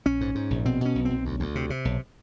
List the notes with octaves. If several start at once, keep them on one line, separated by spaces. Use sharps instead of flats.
A#1 C#4
G#2
G#2
A#1
B2 C4
B2 C#4
B1
C4
B1
D2
D2
C3
C3
B1